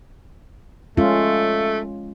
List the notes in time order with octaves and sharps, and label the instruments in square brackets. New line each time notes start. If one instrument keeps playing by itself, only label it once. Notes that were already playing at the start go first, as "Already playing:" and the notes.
[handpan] G#3 C#4 F4 [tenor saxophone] A3